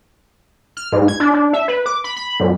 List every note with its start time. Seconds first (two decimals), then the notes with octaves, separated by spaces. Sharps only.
0.77 F6
0.92 G#2
1.08 G#6
1.20 D4
1.34 D4
1.53 E5
1.68 B4
1.86 D6
2.04 B5
2.16 B5
2.40 F#2